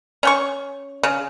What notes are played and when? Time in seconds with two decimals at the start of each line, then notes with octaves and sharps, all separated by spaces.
0.23 C#4 G5 C#6
1.03 C#3